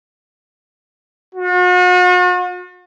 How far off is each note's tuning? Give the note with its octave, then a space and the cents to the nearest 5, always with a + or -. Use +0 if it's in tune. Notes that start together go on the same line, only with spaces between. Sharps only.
F#4 -45